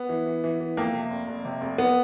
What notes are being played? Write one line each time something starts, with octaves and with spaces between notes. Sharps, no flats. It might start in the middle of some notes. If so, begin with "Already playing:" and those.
Already playing: B3
E3
E3
E3
E3
F2 A#3
C3
F1
F1
C3
F1
B3